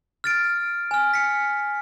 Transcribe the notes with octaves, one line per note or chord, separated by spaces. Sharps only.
F6 A6 D7
G#5 F6
B6 C#7